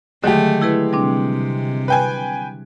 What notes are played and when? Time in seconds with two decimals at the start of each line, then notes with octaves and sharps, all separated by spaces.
0.24 D3 D#3 F#3 G#3 A3 G4
0.61 E4 G#4 B4
0.93 C3 G3 C4 D4
1.88 B4 G5 G#5